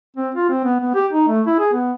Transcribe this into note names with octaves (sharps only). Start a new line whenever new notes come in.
C4
F4
C4
B3
B3
G4
D#4
A3
E4
G#4
B3